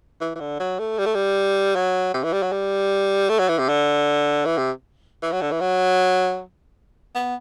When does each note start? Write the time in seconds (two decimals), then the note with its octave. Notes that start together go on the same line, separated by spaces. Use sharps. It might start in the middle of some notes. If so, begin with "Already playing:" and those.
0.21 E3
0.36 E3
0.40 D3
0.60 F#3
0.79 A3
0.98 G3
1.06 A3
1.15 G3
1.75 F#3
2.14 C3
2.24 E3
2.33 G3
2.42 F#3
2.52 G3
3.29 A3
3.39 F#3
3.49 E3
3.58 C3
3.69 D3
4.45 E3
4.58 C3
5.22 E3
5.32 F#3
5.41 D3
5.51 E3
5.60 F#3
7.15 B3